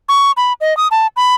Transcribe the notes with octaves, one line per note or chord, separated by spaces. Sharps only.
C#6
B5
D#5
D#6
A5
B5